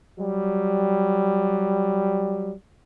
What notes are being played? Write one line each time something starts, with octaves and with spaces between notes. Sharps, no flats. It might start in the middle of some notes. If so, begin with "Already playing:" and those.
F#3 G3